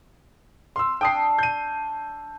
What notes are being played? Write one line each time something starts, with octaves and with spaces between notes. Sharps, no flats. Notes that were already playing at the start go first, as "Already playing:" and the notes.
F5 C6 E6
D4 G5 C6 D#6 C7
G6 D#7